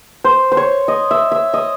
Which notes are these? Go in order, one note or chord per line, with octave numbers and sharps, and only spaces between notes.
C5
C5
C#5
D#5
E5
E5
D#5